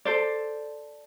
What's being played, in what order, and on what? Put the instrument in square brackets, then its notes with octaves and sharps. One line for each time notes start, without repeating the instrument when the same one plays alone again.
[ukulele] A4 C5 D5